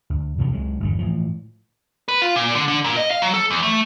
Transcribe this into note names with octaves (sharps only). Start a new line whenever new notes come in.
D2
F2 C3 D#3 F3
C#2 F#3 G#3
G1 E2 D3
A2 E3 F3
B4
F4
A#2
D3
D3
A#2
D#5
F5
F#3
A4
E2
A3